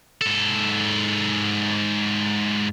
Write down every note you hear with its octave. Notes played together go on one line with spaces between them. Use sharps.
G#2 A4